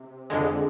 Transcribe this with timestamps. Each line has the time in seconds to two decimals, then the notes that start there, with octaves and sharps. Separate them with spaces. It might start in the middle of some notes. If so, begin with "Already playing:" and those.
Already playing: C3
0.30 F2 D3 G#3